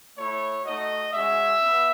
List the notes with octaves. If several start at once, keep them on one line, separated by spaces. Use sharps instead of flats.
A3 E4 C#5
A3 D#4 F#4 D#5
G#3 C#4 F#4 E5
B3